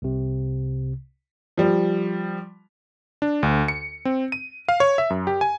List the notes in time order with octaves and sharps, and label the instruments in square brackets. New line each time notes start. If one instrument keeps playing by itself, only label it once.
[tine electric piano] C2 C3
[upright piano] F3 G3
[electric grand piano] D4
D2
C#7
C4
D#7
F5
C#5
E5
F#2
G4
G#5